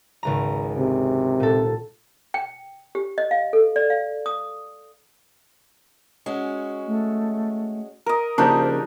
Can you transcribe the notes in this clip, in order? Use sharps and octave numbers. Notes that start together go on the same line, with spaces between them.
G#1 C#2 A#5
C3
A#2 A4
G5
G4
D#5
F5
A4
D5
F5
D#6
G#3 C#4 F#4
A3
A#4 D#5
C#3 F3 A#3 D4 D#4 G4 C5